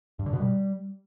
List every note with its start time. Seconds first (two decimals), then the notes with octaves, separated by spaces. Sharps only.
0.19 G2
0.26 D3
0.33 B2
0.40 G3